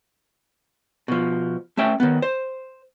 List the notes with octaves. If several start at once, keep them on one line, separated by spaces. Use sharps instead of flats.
B2 F3
A3 C#4 E5 G5
D#3 B3
C5